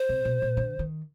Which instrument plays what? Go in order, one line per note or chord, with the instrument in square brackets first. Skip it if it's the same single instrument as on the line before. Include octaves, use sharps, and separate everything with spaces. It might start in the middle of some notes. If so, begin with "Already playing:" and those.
Already playing: [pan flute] C5
[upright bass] C3
B2
A#2
D3
D#3